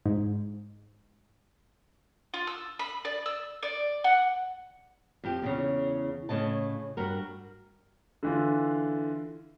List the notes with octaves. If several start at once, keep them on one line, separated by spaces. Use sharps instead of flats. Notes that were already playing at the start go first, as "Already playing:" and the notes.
G#2
F4
E6
B5
D5
E6
D5
F#5
F2 G4
E2 A2 C#3
A2 C#3 D#5 A5
G2 F#4 A#4
D3 E3 F4